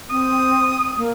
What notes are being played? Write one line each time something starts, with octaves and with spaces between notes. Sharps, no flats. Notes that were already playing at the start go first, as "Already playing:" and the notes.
C4 D#6
A#3